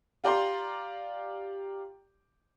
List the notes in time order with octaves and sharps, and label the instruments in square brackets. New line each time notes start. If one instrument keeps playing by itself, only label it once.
[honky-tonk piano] F4 G4 D5 G5 A#5 C6